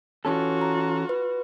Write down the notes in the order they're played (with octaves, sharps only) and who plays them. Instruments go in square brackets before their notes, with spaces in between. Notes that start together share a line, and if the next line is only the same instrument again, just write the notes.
[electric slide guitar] E3 C#4 A4 [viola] F4 F#4
[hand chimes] A#5
B4